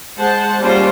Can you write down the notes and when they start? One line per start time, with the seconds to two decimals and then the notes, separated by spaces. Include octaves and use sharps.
0.17 G#3 C5 F#5 A5
0.60 G3 G#3 A#3 C#4 F4 C5